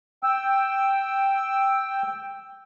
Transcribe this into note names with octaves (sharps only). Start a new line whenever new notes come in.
G5 E6